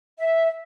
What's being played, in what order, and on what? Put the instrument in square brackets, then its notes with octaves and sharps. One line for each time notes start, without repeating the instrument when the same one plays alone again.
[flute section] E5